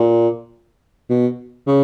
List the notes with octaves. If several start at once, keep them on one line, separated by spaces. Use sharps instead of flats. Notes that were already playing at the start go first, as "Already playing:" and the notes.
Already playing: A#2
B2
C#3